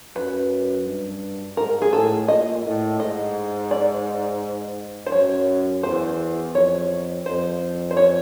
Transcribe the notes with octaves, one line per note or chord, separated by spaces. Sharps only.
F#2 B4
G2
G#2 A#4
G#4
A2 A4
A#2 D#5
A2
G#2 D#5
D5
C5
F#2 C#5
E2 C5
F2 C#5
F2 C5
C5
C#5